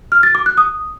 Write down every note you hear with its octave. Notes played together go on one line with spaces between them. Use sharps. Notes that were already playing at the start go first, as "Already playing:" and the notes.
F6
A6
D6
F#6
D#6